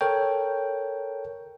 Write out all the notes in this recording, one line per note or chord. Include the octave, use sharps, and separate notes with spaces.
A4 A#4 C#5 G5